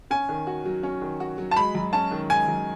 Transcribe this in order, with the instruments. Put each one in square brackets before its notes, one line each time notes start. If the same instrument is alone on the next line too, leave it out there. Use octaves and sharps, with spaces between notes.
[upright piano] C#4 [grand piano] G#5
[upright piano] D#3
F#4
F#3
C#4
D#3
F#4
F#3
[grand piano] A5
[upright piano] G#3 [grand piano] B5
[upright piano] F#2
[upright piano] C#4 [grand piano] A5
[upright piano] D#3
[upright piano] G#3 [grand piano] G#5
[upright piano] F#2